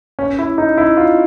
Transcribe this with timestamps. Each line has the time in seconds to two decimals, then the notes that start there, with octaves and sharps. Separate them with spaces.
0.19 C#4
0.39 E4
0.58 D#4
0.77 E4
0.97 F4